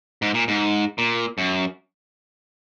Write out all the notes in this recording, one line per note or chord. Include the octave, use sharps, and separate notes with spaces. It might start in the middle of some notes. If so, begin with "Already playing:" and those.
G#2
A#2
G#2
A#2
F#2